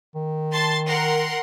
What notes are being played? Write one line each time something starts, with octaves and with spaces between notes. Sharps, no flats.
D#3
A5 C6 A6
A#4 F#5 C6